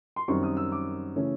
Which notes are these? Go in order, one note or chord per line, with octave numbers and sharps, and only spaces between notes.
C6
F#2 D#3 G3 C4 C#6
D#6
E6
D6
C#3 E3 A3 C#4